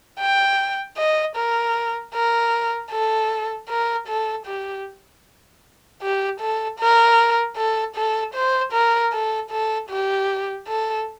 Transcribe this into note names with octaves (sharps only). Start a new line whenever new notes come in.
G5
D#5
A#4
A#4
A4
A#4
A4
G4
G4
A4
A#4
A4
A4
C5
A#4
A4
A4
G4
A4